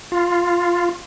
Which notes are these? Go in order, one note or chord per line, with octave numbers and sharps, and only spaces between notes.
F4